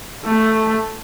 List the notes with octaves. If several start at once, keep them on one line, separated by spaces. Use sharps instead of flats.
A3